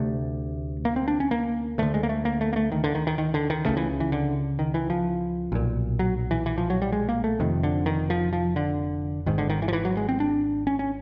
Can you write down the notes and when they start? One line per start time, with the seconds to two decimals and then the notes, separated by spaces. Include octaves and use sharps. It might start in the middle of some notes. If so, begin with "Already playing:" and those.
Already playing: D2 C3 A3
0.85 A#3
0.96 C4
1.08 D4
1.20 C#4
1.31 A#3
1.78 D2 D3 A3
1.94 G#3
2.03 A#3
2.09 A3
2.25 A#3
2.41 A3
2.53 A#3
2.56 A3
2.72 D#3
2.84 D3
2.95 D#3
3.07 D#3
3.18 D#3
3.34 D3
3.50 D#3
3.65 C#2 C#3 A3
3.77 E3
4.00 E3
4.12 D3
4.59 D#3
4.74 E3
4.90 F3
5.52 B1 A#2
5.99 F#3
6.31 E3
6.46 E3
6.58 F3
6.70 F#3
6.82 G3
6.92 G#3
7.09 A#3
7.24 A3
7.39 F1 F2 C3 D#3
7.63 D3
7.86 D#3
8.10 F3
8.33 F3
8.56 D3
9.26 G#1 G#2 D#3
9.38 D3
9.50 D#3
9.62 E3
9.68 F3
9.73 E3
9.85 F#3
9.97 G#3
10.09 C4
10.20 D4
10.67 C#4
10.79 C#4